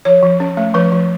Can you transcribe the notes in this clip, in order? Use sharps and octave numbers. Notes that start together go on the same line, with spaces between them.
F3 C#5
F3
C#4
A3
F3 B4
F3